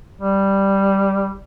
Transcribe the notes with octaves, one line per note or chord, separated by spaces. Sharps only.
G3